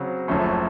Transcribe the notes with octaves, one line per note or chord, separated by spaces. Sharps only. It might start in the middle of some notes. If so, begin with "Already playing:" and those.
Already playing: C#3 F#3 C4 F#4
F#1 F#2 F3 A3 C#4